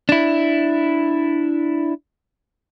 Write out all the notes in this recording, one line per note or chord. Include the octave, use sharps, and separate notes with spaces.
D4 E4